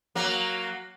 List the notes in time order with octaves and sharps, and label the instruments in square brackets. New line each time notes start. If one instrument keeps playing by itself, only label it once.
[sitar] F#3 A#3